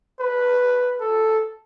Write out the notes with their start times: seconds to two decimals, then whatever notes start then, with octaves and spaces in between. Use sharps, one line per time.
0.20 B4
1.00 A4